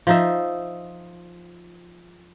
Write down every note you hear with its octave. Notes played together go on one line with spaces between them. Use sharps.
F3 D#4 E5